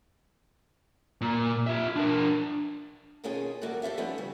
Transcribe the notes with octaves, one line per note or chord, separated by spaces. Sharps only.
A#2
F4 E5
D4 A#4
B2 D#3 A#3 C#4 F4 G#4
A2 E3 G3 A#3 F#4
G4 A4 C#5 E5 F5
F3 G3 A3 B3 C#4 D#4
C#3 G3